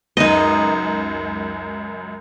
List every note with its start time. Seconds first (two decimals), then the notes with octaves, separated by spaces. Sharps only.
0.17 C#2 F#2 D#4 D#5